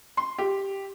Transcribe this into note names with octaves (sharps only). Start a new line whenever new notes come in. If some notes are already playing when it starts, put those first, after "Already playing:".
C6
G4